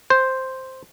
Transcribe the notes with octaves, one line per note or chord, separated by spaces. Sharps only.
C5